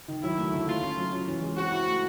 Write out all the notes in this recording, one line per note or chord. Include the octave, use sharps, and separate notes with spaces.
D#3
F#3 E4
A3
D3
A3 F4
C#4
F#3
C#4
E3
G#3
C4 F#4
E4
A3